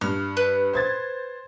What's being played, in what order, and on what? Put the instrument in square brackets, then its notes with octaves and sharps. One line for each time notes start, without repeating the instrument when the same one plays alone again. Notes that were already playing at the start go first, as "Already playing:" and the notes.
[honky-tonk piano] G2 [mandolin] F6
[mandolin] B4
[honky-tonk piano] C5 G#6 A6